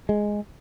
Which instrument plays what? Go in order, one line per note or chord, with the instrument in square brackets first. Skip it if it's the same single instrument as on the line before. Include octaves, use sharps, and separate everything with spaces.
[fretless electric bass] G#3